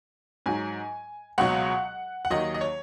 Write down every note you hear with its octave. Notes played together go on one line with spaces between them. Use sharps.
G#2 F#3 G#5
C#2 B2 F#3 F#5
F#5
D#2 D#3 F#3 D#5
D#5
C#5